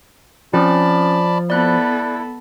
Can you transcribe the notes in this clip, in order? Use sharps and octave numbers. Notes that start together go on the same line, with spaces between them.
F3 C4 C#4 D5 A5 B5
B3 E4 A4 D5 F#6